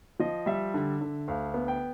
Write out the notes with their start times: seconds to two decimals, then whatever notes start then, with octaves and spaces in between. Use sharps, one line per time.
0.20 F3 D#5
0.46 G3 E5
0.74 D3
1.01 D3
1.28 D2 F5
1.54 B3
1.68 G5